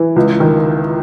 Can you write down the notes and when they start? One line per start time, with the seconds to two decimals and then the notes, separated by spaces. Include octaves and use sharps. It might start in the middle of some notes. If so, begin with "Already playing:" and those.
Already playing: E3
0.16 C#2
0.40 D#3